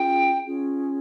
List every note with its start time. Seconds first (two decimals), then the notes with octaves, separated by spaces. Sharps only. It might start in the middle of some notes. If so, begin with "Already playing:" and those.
Already playing: C#4 F4 G#4 G5
0.45 C#4 F4 G#4